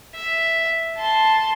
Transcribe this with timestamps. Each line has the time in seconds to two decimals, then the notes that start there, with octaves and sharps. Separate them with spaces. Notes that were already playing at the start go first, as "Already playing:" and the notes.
0.15 E5
0.97 A5 C6